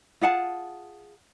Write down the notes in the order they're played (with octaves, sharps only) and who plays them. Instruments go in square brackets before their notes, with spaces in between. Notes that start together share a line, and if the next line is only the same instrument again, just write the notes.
[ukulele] F4 G#4 F#5 A5